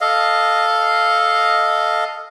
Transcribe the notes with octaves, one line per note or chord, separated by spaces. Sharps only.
A4 D#5 F5